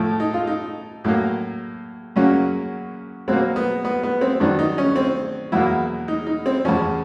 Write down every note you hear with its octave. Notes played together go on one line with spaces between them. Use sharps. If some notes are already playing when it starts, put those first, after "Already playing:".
Already playing: A2 F3 A3
D#4
F4
D#4
A2 F#3 A#3
F#2 C#3 F#3 A#3 C#4
B2 F#3 A#3 C4
B3
B3
B3
C4
G2 D#3 F#3 D4
D#4
C#4
C4
E2 B2 F#3 A#3 E4
D#4
D#4
C4
E2 C#3 F3 C#4